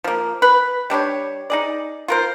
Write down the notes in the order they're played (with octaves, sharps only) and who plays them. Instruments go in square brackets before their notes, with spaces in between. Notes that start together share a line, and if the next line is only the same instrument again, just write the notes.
[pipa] F3 A#3
B4
G3 D4 G4 C#5
D#4 G#4 D5
F4 A#4 C5